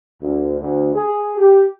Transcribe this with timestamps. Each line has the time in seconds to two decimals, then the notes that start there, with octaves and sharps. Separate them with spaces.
0.22 D2
0.60 D2
0.95 G#4
1.37 G4